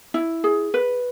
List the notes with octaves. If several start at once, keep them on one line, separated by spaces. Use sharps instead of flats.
E4
G#4
B4